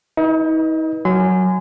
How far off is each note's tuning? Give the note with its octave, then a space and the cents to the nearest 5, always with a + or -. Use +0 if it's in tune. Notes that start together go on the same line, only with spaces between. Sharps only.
D#4 +45 B4 -25 D#5 +0
F#3 +0 G#5 +0 C6 -40